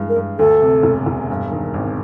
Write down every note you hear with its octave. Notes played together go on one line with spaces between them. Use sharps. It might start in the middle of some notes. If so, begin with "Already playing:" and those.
Already playing: G2 E3 G#3
A#4
G2
D2 A4
C3
E1
E1
G2
D#3
G#1